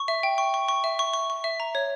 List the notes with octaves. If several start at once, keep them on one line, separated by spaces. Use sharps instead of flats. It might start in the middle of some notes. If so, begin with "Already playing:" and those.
Already playing: C#6
E5
G5
C#6
C#6
C#6
E5
C#6
C#6
C#6
E5
A#5
C#5